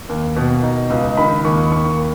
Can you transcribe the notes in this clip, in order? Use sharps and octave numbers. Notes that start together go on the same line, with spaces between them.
D#2
B2
D#4
C#2
D#3 B5
D#2 C#6
D#2 C#6
A#3